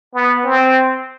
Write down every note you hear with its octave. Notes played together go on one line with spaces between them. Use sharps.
B3
C4